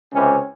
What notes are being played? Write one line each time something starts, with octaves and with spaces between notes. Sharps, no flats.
C#2 C3 E3 C#4